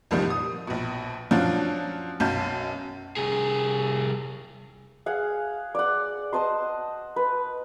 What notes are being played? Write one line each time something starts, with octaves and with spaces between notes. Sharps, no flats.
C2 F2 A#2 D#3 F3 G3
D#6
A#1 B2
F3 F#3 C#4 D4 F4 F#4
B1 F#2 C#4 F5 A5 G6
C2 G#4
G#4 F5 F#5
D5 F#5
C5 D#5 A5 C6
B4